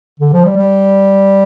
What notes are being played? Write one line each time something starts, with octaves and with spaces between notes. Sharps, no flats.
D3
F3
G3
G3